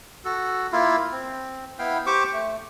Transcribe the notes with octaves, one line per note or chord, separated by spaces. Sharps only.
F#4 A4
A#3 E4 F4
C4
B3 E4 F5 G5
G4 C5 C#6 D6
A3